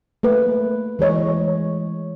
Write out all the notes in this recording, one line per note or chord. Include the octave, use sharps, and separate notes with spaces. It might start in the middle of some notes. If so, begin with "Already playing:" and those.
A3 A#3 B4
E3 G#3 C#5 D#5